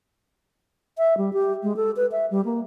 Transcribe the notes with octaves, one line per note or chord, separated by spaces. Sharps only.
E5
G3
G4
G#3
A4
B4
E5
G3
A#3